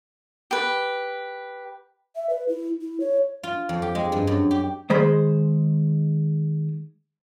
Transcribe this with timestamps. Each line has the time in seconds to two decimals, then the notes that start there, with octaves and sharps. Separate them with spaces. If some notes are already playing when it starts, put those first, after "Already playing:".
0.51 G4 B4
2.16 E5
2.30 B4
2.49 E4
2.81 E4
3.00 C#5
3.43 F4
3.69 F2
3.82 G4
3.95 G#3
4.12 G2
4.27 F#2
4.51 G4
4.90 D#3 G#3 C5 B5